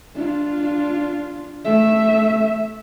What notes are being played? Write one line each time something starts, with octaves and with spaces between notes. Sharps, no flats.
D4 F4
A3 E5